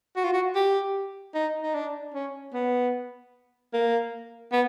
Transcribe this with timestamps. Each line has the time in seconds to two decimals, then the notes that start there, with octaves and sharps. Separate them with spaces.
0.16 F#4
0.24 F4
0.33 F#4
0.55 G4
1.35 D#4
1.62 D#4
1.74 D4
2.14 C#4
2.54 B3
3.73 A#3
4.53 B3